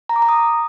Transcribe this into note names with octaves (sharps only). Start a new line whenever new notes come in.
A#5
D6
A#5
D#6